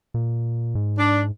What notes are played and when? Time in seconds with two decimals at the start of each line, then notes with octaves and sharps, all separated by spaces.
0.14 A#2
0.75 G#2
0.98 D4